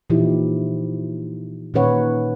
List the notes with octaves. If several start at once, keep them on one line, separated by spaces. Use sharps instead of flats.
A#2 E3 F3 D#4 E4 G4
A#2 D#3 C#4 B4 C#5 F#5